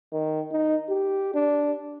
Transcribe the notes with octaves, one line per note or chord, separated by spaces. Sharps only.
D#3
D#4
G4
D4